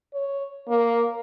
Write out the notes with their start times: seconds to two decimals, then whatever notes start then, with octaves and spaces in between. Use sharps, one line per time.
0.14 C#5
0.68 A#3